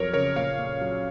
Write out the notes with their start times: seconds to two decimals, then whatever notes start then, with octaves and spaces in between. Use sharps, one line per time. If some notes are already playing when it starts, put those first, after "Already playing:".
Already playing: F2 F#3 A#4 C#5
0.13 C#3 A#4 C#5
0.36 A#2 C#5 F5
0.59 A#2
0.81 F#3